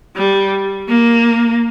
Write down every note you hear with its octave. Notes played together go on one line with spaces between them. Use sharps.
G3
A#3